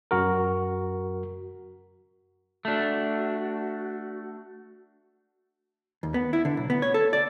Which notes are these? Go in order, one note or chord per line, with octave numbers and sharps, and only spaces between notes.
F#2 F#4 A#4
A3 D4 F#4
D#2
B3
E4
D3
B1
B3
C#5
A4
D5